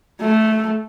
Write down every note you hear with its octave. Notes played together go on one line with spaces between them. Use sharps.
A3